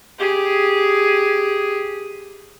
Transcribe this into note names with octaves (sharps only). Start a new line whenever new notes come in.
G4 G#4